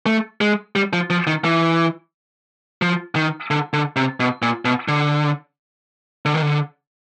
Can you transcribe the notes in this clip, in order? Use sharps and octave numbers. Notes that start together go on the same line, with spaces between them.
A3
G#3
G3
F3
F3
D#3
E3
F3
D#3
D3
D3
C3
B2
A#2
B2
D3
D3
D#3
D3